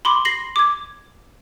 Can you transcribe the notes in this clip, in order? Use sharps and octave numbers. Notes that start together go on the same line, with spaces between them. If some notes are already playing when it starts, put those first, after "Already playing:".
B5 C6 D6
A#6 C7 F#7
D6 G#6